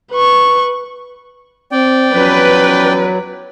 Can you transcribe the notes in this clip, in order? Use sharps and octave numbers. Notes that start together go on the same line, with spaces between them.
B4 C#6
C4 D5 G5
E2 F3 F#3 C#4 B4